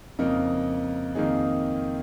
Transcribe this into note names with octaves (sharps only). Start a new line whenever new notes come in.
F2 C#3 A#3 D#4 A#4
F2 D#3 A#3 D#4 G#4